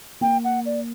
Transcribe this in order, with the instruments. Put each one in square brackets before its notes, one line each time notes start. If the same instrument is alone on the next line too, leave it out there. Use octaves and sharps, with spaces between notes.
[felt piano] A#3 [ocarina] G5
[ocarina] F#5
D5